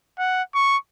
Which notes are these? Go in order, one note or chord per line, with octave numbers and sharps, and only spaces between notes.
F#5
C#6